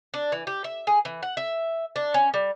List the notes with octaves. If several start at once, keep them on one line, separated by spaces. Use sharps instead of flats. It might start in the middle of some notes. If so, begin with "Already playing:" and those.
D4
E3
G4
E5
G#4
E3
F#5
E5
D4
C#4
G3